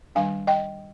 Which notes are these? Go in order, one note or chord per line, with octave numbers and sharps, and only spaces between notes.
D#3 G3 D4 F5 G#5
D#5 G5